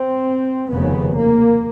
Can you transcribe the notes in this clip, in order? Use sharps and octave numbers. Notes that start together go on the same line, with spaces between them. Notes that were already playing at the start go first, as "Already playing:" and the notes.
Already playing: C4
F1 D#2 C#3 B3
A#3